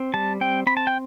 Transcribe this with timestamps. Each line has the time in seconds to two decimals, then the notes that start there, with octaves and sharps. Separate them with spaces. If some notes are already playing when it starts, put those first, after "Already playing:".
Already playing: C4
0.14 G3 A5
0.41 C4 G5
0.67 C4 B5
0.77 A5
0.87 G5